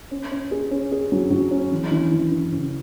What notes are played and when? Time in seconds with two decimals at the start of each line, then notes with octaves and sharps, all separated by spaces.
0.11 C#4
0.31 C#4
0.51 G#4
0.71 C#4
0.92 G#4
1.12 F#3
1.31 F#3
1.51 C#4
1.72 E3
1.92 E3
2.11 E3
2.32 E3
2.52 C#3